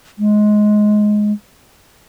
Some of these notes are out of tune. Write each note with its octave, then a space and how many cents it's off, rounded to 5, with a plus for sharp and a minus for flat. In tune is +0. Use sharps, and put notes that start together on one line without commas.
G#3 +15